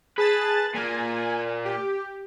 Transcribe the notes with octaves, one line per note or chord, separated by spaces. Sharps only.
G#4 B4 A5 A6
A#2 A#3 G#5
G4